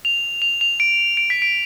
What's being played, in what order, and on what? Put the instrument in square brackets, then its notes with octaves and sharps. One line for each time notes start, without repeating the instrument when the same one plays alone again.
[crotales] F7
F7
F7
D7
D7
B6
D7